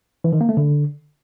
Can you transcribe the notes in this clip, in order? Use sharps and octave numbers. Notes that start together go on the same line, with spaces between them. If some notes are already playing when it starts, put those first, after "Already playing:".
E3
D#3
A#3
A3
D3